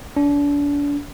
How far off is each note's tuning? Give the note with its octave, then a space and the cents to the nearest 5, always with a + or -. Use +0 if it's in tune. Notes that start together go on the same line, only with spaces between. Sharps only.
D4 -35